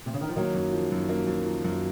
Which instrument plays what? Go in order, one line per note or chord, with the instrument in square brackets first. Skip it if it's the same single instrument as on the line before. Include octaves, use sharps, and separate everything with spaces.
[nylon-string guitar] C3
C#3
D#3
F3
[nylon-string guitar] D#3 F#3 [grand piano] A#3
[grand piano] F#2
F3
F#2
A#3
F#2
F3
F#2